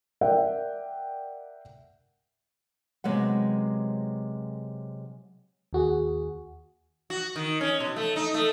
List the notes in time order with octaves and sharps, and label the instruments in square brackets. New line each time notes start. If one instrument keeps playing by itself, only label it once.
[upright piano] A#4 D5 E5 F#5 G5
[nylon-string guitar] C3 F#3 G#3 B3 F#5
[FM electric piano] D#2 F#4 G#4
[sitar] F#4
D#3
C#4
B2
A3
D#4
A3